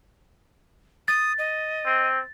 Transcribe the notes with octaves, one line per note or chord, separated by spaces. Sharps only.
D#6 A6
D#5
C4